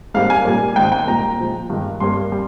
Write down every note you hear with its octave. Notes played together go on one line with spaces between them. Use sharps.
G#2 G3 A#3 F5
G#5
A#2 G3 A#3
G#2 D#3 G#3 G5
G5
A#2 G3 A#3 A#5
A#2 F3 G#3
G2 D#3 G#3
G2 G3 A#3 C6
G3